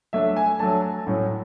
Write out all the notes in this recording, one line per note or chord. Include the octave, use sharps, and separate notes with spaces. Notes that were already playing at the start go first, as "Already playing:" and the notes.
F#3 A3 D4 E5
G#5
F#3 A3 D4 A5
A2 F#3 C#4